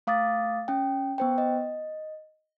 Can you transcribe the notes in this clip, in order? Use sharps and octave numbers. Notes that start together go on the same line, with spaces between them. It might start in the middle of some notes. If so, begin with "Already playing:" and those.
A3 F5 D6 D#6 A6
C#4 G5
B3 C5 G5
D#5